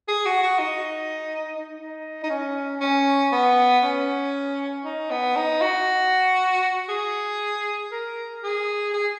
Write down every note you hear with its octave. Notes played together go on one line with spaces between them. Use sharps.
G#4
F#4
F#4
D#4
D#4
D#4
C#4
C#4
B3
C#4
D#4
B3
D#4
F#4
G#4
A#4
G#4
G#4